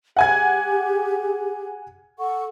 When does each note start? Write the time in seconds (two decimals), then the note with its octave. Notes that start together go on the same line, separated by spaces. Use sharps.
0.17 G4 G#4 F#5 G#5 G#6
2.19 A4 F#5 C#6